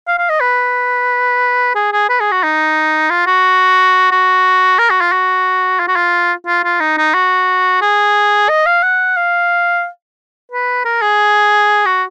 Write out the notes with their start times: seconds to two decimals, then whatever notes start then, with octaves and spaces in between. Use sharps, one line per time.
0.07 F5
0.18 F5
0.29 D#5
0.40 B4
1.75 G#4
1.92 G#4
2.09 B4
2.20 G#4
2.32 F#4
2.43 D#4
3.10 F4
3.27 F#4
4.12 F#4
4.79 A#4
4.90 F#4
5.01 F4
5.12 F#4
5.79 F4
5.88 F#4
5.96 F4
6.46 F4
6.64 F4
6.80 D#4
6.98 D#4
7.14 F#4
7.81 G#4
8.49 D#5
8.66 F5
8.83 F#5
9.17 F5
10.52 B4
10.85 A#4
11.02 G#4
11.85 F#4